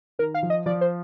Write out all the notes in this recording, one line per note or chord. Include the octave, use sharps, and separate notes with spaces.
D#3 A#4
F5
F3
D#5
F3 D5
C5